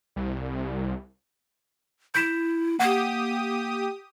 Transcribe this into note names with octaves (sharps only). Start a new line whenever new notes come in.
C2
E4 G6 B6 E7
A#3 G4 F#5 D#6